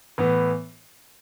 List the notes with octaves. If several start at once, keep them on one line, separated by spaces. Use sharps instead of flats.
A2 E3 B3